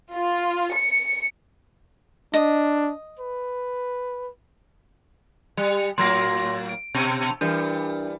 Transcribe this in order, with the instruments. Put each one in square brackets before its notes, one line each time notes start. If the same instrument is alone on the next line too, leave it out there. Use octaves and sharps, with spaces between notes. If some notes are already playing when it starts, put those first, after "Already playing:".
[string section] F4
C#7
[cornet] D4 [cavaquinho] D#5
[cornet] B4
[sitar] G3
[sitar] A2 F#3 A#3 [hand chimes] C6 A#6
[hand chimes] D7
[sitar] B2
[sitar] E3 G3 [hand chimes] D4 A#4